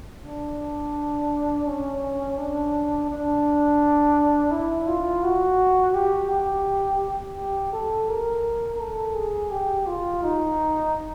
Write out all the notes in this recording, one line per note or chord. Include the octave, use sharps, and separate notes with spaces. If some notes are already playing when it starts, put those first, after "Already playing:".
D4
C#4
D4
D4
E4
F4
F#4
G4
G4
G4
A4
A#4
A4
G#4
G4
F4
D#4